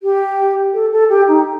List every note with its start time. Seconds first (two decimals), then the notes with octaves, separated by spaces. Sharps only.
0.02 G4
0.73 A4
0.92 A4
1.09 G4
1.27 D#4